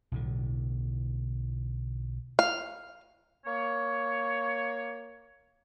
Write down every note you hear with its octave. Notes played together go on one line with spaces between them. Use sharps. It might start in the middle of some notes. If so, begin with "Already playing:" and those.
B1 A2 D3
F5
A#3 C#5